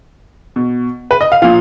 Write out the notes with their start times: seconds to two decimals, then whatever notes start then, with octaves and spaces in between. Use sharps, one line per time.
0.56 B2
1.11 B4
1.21 D#5
1.32 F5
1.42 A#2 F3 F5